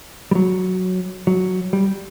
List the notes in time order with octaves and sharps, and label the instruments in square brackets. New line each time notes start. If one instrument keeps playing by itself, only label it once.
[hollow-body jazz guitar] G3
F#3
F#3
G3